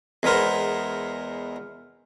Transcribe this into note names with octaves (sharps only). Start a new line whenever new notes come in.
E2 G#3 B3 A#4 C5